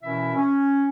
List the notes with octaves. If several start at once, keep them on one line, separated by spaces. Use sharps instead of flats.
B2 E3 C#4 E4 A#4 E5
C#4